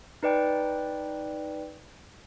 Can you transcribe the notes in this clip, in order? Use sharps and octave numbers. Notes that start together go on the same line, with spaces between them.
D#4 B4 D5 G5